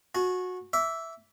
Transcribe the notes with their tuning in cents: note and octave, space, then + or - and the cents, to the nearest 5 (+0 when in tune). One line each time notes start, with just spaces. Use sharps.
F#4 -20 G#5 +40
E5 +0 D6 -30